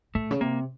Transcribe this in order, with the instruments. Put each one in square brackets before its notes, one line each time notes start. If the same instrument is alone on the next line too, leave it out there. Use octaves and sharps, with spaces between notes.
[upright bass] A2 [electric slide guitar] A3
[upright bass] C#3
[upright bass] C3 [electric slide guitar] A#3